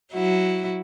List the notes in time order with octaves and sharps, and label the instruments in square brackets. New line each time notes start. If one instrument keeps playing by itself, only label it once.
[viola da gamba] F#3 E4 F#4